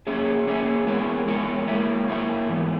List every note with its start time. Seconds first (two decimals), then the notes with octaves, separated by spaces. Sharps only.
0.07 A#3 C#4 G#4 C#5 E5
0.47 A#3 C#4 G#4 C#5 E5
0.87 G#3 B3 E4 A#4 C#5
1.27 G#3 B3 E4 A#4 C#5
1.67 A#3 E4 A#4 C#5 E5
2.08 A#3 E4 A#4 C#5 E5
2.48 G#2 E3 B3